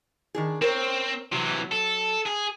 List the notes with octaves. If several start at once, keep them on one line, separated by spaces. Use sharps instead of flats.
D#3 D4 G#4
C4 A#4 C5 C#5
C3 E3 F#3
A4
G#4